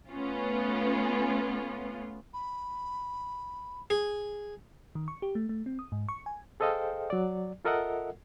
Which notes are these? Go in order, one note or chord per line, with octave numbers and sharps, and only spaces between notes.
A3 B3 C#4 F4
B5
G#4
D#3
C#6
G4
A3
A3
C4
D#6
G#2
C#6
G#5
G#4 A4 C5 D#5 F5 G5
F#3 D5
F4 A4 A#4 D#5 E5 F#5